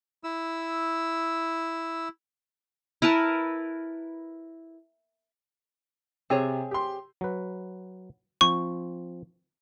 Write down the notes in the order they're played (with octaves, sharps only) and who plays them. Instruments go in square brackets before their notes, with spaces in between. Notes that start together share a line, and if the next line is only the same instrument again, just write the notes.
[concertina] E4 E6
[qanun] E4 A#4 B4 A5
[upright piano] C3 [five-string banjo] C4 G#4 C#5
[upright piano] G4 C6
[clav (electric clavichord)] F#3 B4
[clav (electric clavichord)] F3 C4 C5 [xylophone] C#6